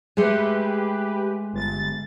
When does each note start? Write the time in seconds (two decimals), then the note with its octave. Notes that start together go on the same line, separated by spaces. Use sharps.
0.17 G#3 A3 G4 B4
1.53 G1 A6